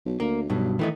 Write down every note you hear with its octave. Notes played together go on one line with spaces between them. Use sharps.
B1
D2 A#3
B1 G2 B2
D#3 E3 A3 D#4